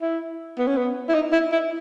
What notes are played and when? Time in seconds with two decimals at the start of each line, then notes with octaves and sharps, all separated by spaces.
0.02 E4
0.58 B3
0.67 C#4
0.77 B3
1.09 E4
1.14 D#4
1.32 E4
1.52 E4